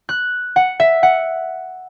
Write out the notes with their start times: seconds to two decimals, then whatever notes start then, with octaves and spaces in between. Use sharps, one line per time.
0.09 F#6
0.56 F#5
0.80 E5
1.03 F#5